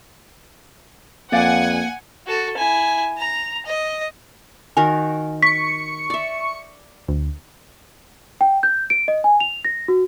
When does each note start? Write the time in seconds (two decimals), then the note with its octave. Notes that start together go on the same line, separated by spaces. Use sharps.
1.32 F2 A#3 B4 D5 F5 F#5 G#5
2.27 F#4 A4
2.57 E4 G#5
3.18 A#5
3.66 D#5
4.77 D#3 F#4 A#4 G#5
5.42 C#6 B6 C#7
6.10 D5 E5
7.08 D2
8.41 G5
8.63 G6
8.90 D7
9.08 D#5
9.24 G#5
9.40 F7
9.65 A#6
9.88 F#4